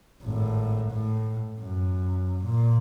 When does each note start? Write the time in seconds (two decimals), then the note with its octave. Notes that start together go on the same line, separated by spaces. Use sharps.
0.23 G#1 A2
0.91 A2
1.61 F#2
2.44 A#2